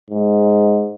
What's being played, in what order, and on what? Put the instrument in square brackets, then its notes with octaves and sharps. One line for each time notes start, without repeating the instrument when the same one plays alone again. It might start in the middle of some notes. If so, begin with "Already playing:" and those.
[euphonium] G#2